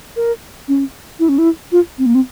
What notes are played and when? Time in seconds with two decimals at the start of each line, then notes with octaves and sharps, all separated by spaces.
0.16 A#4
0.68 C#4
1.19 E4
1.29 C#4
1.38 E4
1.72 F4
1.98 C4
2.06 A#3
2.15 C4